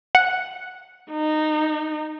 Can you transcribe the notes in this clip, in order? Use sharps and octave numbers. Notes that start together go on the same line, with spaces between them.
F#5
D#4